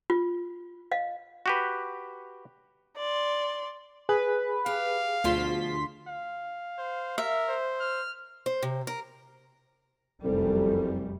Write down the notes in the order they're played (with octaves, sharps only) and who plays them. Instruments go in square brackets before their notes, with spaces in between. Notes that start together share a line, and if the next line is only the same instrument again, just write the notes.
[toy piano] F4
D#5 F5
[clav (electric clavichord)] F#4 G4 B4
[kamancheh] D5 C6
[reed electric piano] G#4 [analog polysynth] B4
[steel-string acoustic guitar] G4 [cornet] F5
[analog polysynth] D2 C6 B6 [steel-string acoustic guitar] B2 F3 F4
[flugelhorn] F5
[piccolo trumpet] C5
[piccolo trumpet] A#4 [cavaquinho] E5
[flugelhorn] C5
[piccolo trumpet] F6
[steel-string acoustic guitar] C5
C3
A#4
[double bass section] F1 F#2 G3 [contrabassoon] C2 [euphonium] A4